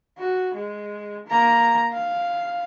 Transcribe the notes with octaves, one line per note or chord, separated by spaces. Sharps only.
F#4
G#3
A#3 A#5
F5